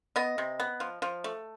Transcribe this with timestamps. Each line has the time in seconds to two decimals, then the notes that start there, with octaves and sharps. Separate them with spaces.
0.16 B3 D#5
0.38 C3
0.60 B3
0.80 F3
1.02 F3
1.24 A3